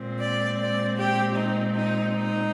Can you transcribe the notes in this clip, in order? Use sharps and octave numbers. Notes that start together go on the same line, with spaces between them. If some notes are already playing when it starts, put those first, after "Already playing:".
Already playing: A#2 G#3 C4
D5
D5
G4
D#4
D#4
D#4